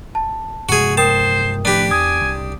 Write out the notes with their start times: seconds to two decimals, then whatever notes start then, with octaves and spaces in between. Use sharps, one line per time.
0.15 A5
0.69 G2 C3 G#3 F#4 G#4
0.97 A#4 C5 G5 A5 D#6
1.65 A2 F3 A3 D4 G4 B4
1.91 E2 G#5 D#6
2.22 C2